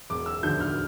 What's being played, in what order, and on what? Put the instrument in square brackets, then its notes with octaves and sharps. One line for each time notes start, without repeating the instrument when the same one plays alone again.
[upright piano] E1 D6
E6
D2 D3 F3 G6
F6